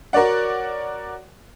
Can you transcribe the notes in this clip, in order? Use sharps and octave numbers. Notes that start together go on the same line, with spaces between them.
F#4 A#4 C#5 D5 F#5